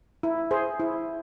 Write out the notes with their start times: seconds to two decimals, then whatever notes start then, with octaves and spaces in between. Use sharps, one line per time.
0.23 E4
0.51 G#4 C5
0.80 E4